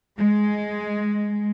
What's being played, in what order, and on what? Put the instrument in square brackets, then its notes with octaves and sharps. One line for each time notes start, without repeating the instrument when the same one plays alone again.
[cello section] G#3